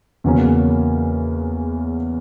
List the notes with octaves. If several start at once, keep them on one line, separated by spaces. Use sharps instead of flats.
E2 C#3 F#3 A#3 C#4